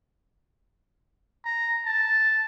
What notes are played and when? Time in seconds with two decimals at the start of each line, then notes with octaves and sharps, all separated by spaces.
1.45 A#5
1.86 A5